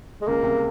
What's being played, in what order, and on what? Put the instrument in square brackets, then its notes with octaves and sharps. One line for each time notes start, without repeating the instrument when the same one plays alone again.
[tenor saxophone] G#3
[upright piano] C#2 C#3 [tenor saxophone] A#3
[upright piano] C2 C3